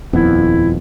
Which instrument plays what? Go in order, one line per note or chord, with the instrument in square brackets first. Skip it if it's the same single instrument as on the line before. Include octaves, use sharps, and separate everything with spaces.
[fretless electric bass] D#1 F2 B3 [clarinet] E4